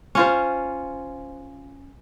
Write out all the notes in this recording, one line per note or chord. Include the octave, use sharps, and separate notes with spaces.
C#4 F4 C5